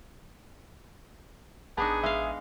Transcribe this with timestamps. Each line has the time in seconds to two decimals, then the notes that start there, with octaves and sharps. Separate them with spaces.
1.77 A1 B3 D4 D#4 G#4 A5
2.04 G#3 E5 F5